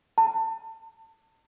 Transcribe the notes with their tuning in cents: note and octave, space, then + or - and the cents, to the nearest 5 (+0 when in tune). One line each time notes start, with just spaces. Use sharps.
A5 +30